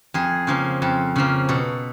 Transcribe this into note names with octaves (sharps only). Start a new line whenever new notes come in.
F2 G#4
C#3 F3 A#3
F2 A4
C#3 F3 A#3
B2 A4